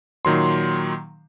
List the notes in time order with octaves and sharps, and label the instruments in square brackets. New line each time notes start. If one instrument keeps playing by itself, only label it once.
[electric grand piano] A#2 D#3 F#3 C6